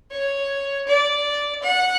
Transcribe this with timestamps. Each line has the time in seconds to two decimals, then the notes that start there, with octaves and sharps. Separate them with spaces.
0.11 C#5
0.87 D5
1.62 F#5